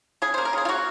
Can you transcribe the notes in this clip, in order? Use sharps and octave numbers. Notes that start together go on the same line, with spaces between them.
C#3 G#4
A#3 C5
A#4
C#3 G#4
F4
A#3 F#4